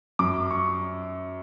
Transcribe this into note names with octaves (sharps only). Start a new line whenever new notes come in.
F#2 D6
C#6